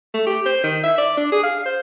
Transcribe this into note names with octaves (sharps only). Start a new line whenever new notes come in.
A3
G4
C5
D#3
E5
D5
D4
G#4
F5
C5